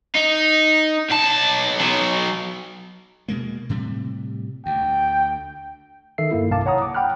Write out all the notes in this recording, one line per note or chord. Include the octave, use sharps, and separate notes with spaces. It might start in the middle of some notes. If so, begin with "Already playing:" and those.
D#4
B1 A5
F#3 B3
B2 G#3 A#3
A2 C3 G3
D2 G5
D#3 A4 E5 C7
G2 A#3 E4
B1 G2 C3 F5 A5 D6
C#5 F#5 A#5 D#6
D6
F#5 G5 B5 F6 F#6